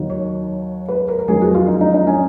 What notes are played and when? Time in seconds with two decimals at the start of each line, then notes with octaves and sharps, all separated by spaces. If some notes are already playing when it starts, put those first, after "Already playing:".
Already playing: D#2 D#3 F#3
0.10 C#5
0.88 B4
1.08 A#4
1.19 A#4
1.28 F2 D#3 F#3 G#4
1.42 F#4
1.55 F4
1.68 D#4
1.81 D#4
1.94 D#4
2.07 C#4